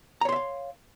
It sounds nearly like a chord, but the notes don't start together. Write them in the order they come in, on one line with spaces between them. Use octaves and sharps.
A#5 C#5 C6 E5 F5